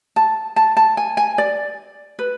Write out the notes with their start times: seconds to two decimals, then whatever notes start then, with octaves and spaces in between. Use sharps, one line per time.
0.16 A5
0.56 A5
0.77 A5
0.97 G#5
1.17 G#5
1.38 D5
2.19 B4